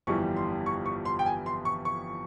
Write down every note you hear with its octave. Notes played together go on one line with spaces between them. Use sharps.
G1 F2 E3 G3 C#6
C6
C#6
C#6
C6
G5
G#5
C6
C#6
C#6